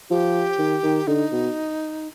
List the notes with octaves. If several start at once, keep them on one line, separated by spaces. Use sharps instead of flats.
F3 G4
D#3
D#3
D3 D#4
B2